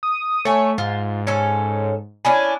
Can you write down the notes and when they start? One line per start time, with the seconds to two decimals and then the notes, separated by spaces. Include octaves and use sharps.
0.03 D#6
0.45 A3 C#5 G#5
0.78 G#2 F4
1.27 C#4 A4
2.25 C#4 D4 E4 G#5